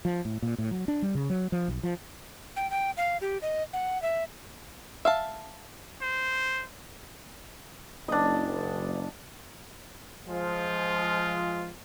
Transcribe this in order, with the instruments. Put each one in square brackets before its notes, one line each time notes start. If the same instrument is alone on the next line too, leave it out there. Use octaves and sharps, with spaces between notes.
[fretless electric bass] F3
A2
A#2
A2
F#3
D4
G3
C#3
F#3
F3
B1
F3
[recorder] G5
G5
F5
G4
D#5
F#5
E5
[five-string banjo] E5 F5 A5
[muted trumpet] C5
[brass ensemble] F#1 [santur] D4 D#5
[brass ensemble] F3 G#3 [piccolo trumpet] F4